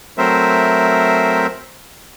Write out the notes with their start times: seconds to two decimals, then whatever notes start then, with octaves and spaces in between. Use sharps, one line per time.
0.18 F#3 A3 C4 A#4 C5 E5